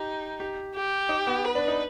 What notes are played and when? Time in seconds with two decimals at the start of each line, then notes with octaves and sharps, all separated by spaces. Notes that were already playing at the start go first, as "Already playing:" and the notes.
Already playing: D#4 G4
0.40 G4
0.75 G4
1.09 D#4
1.27 B3
1.45 B4
1.55 D4
1.68 D#4